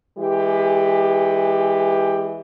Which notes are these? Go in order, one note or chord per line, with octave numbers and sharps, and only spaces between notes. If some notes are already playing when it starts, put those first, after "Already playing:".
E3 G#3 G4